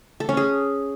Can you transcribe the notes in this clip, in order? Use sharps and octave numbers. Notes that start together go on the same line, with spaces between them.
A4
C#4
G#4